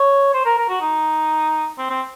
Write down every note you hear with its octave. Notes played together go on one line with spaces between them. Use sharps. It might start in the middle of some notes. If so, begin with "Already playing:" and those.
Already playing: C#5
C5
A#4
A#4
F#4
D#4
C4
C4